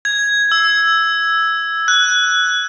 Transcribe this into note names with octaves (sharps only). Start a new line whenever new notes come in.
G#6
E6
F#6